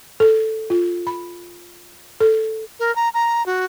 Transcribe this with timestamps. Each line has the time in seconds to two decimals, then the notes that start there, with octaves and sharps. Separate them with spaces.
0.20 A4
0.70 F4
1.07 B5
2.20 A4
2.80 A#4
2.96 A#5
3.14 A#5
3.46 F#4